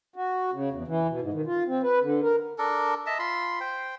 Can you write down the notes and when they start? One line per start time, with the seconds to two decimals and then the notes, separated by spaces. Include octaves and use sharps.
0.16 F#4
0.53 C#3
0.72 E2
0.88 E3
1.09 B2
1.21 G#2
1.34 D#3
1.46 F4
1.67 C4
1.83 B4
2.02 D3
2.23 A#4
2.58 D4 A4 A#4
3.06 D#5 E5 A5
3.19 F4 B5 C6
3.60 C5 G5